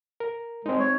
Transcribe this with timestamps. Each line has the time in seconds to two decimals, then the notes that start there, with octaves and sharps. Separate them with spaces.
0.20 A#4
0.66 G#3 C4 D#4
0.80 C#5